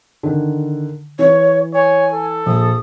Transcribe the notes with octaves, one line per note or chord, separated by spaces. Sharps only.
D3 D#3
E3 C#5
C#5 G#5
A4
A#1 D#6